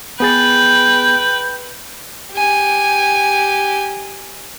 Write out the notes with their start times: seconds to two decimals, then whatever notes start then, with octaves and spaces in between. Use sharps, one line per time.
0.20 B3 G#4 B4 G5 A6
2.33 G4 G#5